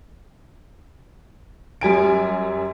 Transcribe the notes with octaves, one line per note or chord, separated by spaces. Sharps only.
F#2 G3 G#5 D7